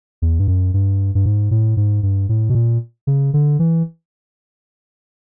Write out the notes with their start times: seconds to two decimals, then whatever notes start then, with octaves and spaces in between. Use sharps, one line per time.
0.22 E2
0.39 G2
0.48 F#2
0.74 G2
1.15 G2
1.26 G#2
1.51 A2
1.77 G#2
2.03 G2
2.29 A2
2.50 B2
2.55 A#2
3.07 C#3
3.34 D3
3.59 E3